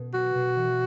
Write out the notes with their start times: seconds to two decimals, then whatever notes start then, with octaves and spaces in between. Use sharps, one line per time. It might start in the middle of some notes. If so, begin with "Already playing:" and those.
Already playing: B2 B3
0.14 F#3 F#4
0.34 B2
0.56 E3